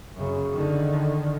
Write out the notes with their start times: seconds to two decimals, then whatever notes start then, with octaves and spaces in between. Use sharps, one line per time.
0.15 F#2 C#3
0.54 D3 D#3